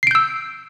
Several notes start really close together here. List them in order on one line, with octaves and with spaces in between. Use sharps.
C7 D7 G6 E6